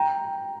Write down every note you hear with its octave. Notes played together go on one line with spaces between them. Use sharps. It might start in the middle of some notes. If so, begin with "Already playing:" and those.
Already playing: G5 A#5